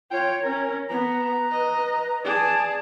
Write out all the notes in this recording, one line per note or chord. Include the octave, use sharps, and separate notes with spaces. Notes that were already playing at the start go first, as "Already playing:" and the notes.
F4 C#5 G5
C#4 A#4
B3 B4 A#5
D#5
G#4 D5 A5